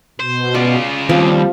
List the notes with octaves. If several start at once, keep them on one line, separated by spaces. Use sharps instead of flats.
B2 C5
C#3 F4 D5
D#2 F3 G3 C4 F5